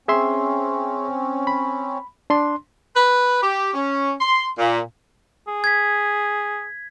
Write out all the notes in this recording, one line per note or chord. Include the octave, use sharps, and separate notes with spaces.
C4 C#4 G#4 E5 C6
B5
D4 C6
B4
G4
C#4
C6
A#2
G#4
G#6 B6